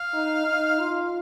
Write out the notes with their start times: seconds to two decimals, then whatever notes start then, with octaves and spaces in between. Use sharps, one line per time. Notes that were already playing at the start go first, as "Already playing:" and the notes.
Already playing: F5
0.13 D#4
0.46 D#4
0.80 F4